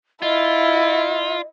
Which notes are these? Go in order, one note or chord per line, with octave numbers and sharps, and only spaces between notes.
E4 F4 D#5